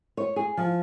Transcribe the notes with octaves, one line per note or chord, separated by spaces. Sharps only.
C#5
G#4
F3